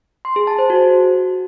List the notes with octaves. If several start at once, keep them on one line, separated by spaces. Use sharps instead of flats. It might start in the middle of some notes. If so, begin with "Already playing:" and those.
C6
G#4
A5
C5
F#4